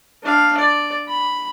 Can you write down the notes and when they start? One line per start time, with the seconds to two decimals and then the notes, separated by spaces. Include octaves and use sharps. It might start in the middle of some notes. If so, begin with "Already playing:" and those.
0.23 D4 F5
0.57 D5
1.08 B5